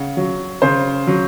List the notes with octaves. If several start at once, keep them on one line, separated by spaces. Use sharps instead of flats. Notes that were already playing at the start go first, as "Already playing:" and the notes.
Already playing: C#3 F#5
F#3
C#3 C5
F#3